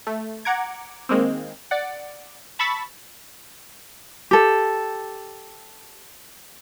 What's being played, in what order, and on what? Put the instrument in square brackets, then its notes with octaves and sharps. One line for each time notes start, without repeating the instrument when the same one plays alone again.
[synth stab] A3
F#5 A#5 D6 G#6
D#3 G#3 A#3 C4
D5 F#5
A5 B5 C#6 E6 A6 B6
[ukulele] G4 A4